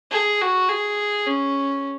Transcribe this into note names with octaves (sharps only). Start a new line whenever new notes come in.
G#4
F#4
G#4
C#4